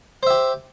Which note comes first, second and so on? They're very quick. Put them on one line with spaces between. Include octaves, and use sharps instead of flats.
C5 E5 G4